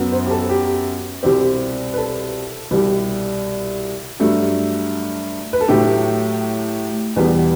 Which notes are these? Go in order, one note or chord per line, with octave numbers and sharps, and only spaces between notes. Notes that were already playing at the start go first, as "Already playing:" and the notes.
Already playing: F#2 F#3 B3
C5
G4
A4
G4
C2 B2 G3 C4 G4
B4
A4
C2 B2 G3
G2 F#3 A3
B4
A4
A2 F#3 A3 G4
E2 B2 G3 B3 B4